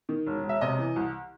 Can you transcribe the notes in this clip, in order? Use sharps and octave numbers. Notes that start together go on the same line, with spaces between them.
D#3
E1
E1
E5
C3 D#5
E3
C2